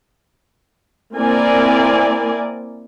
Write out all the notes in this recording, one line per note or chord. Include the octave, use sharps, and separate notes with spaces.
A#3 C4 E4 A#4 D5 G#5